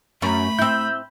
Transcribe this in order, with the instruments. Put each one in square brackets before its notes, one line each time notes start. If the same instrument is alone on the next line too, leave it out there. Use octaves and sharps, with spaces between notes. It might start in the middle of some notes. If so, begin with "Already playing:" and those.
[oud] F#2 C#4 [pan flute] A3 [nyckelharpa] B5
[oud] C4 E4 [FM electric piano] E6 G6